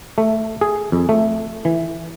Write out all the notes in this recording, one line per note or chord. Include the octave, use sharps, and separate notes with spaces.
A3
G#4
F2
A3
E3